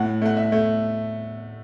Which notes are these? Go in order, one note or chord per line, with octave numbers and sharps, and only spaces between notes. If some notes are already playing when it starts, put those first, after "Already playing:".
Already playing: A2 A3 F#5
A3 F#5
E5
A3